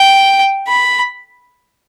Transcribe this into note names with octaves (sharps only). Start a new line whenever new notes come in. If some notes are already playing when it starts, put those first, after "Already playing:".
Already playing: G5
B5